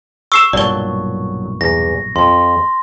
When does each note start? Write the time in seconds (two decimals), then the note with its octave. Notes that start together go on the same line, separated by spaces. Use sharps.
0.32 C#6 E6 C7 E7
0.53 B1 G2 A#2 F#3 D5 A5 G7
1.61 E2 A#6
2.16 F2 C6